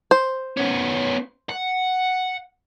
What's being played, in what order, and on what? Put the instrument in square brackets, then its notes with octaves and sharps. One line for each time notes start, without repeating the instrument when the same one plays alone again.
[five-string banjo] C5
[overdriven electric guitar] B3 C#4
F#5